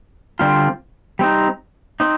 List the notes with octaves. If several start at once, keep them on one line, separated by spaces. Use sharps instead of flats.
D3 G3 C4 F4
G3 C4 D#4
C4 D#4